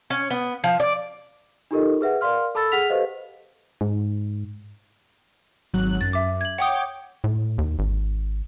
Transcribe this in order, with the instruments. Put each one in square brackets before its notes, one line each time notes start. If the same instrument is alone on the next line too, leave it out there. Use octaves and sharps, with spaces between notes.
[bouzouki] C#4
B3
F3
D5
[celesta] D#4 F4 G4 A4 A#4 D#5
G#4 B4 E5 F#5
A#4 D5 F5 C6 F6
A4 A5 B5 E6 A6
G#4 F#5 F6 B6 F7
G4 A4 B4 C5 D#5 F5
[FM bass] G#2
[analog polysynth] G#1 F#3 F#6
[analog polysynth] F#2 [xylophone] A6
[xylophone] E5 D6
G#6 F#7
[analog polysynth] C#5 D6 G6 [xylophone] F#5 G5 D#6
[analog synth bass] A2
D#2
G#1